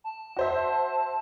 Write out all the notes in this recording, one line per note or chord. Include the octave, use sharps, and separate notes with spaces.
A5
F#4 C5 E5